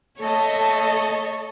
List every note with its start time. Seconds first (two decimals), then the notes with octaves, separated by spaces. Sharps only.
0.20 A3 A4 C#5 D#5 A5